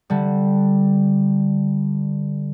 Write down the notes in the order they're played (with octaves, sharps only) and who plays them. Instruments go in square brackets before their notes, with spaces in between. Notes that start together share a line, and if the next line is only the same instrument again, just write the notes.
[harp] D3 G3